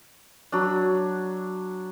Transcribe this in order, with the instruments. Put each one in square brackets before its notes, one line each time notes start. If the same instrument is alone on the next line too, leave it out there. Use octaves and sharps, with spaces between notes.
[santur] F#3 D4